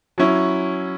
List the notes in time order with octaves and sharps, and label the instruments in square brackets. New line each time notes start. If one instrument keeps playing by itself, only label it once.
[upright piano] F#3 C#4 E4